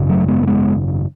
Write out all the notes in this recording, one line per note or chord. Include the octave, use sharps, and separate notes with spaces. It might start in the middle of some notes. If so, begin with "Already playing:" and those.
Already playing: G#1 F#2 C#3
F#3 A3
G#3 B3
A3
G#3 B3